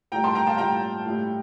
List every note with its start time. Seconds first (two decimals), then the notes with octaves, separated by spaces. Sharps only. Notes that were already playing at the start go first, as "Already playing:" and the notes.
0.12 A2 G3 G5 A#5
0.24 A5 C6
0.35 G5 A#5
0.47 F5 A5
0.58 A2 G3 G5 A#5
1.06 A2 G3